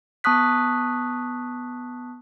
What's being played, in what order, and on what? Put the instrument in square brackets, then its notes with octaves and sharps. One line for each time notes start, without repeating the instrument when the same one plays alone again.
[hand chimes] B3 A5 C#6 D#6 F#6 B6